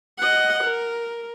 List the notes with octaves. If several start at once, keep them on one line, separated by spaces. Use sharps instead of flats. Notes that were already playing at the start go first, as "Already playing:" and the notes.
D#5 F#5
A#4